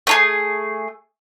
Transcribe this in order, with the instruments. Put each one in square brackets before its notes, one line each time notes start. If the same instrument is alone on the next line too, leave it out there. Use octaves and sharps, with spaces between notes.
[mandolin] A3 D4 G#4